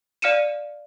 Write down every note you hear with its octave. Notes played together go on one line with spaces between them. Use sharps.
D5 F5 F6 C#7 D#7 E7